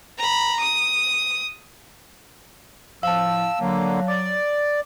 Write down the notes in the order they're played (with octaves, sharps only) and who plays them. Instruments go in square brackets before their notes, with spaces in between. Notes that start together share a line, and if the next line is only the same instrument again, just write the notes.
[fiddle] A#5 B5
D#6
[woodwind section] A2 F3 [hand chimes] F5 A5 [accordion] E6
[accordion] D3 A#3 [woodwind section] F#3
[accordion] D5 [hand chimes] D6